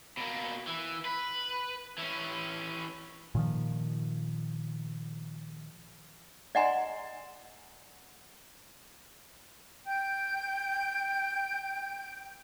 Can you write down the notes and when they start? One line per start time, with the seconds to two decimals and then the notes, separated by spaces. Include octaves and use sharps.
0.17 B2 A#3
0.67 E3
1.05 B4
1.98 E3 C#4
3.35 A#2 D#3 F3
6.55 D5 D#5 F#5 G#5 A#5 C6
9.85 G5 G6